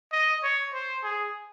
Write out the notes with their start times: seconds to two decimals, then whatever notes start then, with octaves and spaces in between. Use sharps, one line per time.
0.12 D#5
0.43 C#5
0.73 C5
1.03 G#4